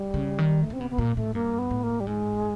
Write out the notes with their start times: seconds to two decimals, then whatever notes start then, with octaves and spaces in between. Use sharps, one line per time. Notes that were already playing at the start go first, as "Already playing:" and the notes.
Already playing: G3
0.14 C#3
0.38 D#3
0.62 A3
0.70 C#3 C4
0.81 C3 B3
0.91 B3
0.98 A#2 A#3
1.16 A2 A3
1.34 G2 A#3
1.59 B3
1.71 A2
1.83 A#3
2.00 G3
2.07 G#2 G#3